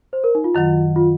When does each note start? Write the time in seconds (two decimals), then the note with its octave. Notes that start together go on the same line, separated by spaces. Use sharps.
0.13 C5
0.24 A#4
0.35 D#4
0.44 F4
0.55 F#2 D#3 F#3
0.96 F4